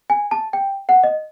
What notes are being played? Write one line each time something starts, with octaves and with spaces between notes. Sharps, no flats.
G#5
A5
G5
F#5
D#5